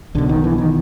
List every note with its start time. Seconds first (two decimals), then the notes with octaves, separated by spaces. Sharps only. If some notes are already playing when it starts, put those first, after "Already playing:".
0.15 B1 B2 D3
0.29 D#3
0.44 E3
0.58 D#3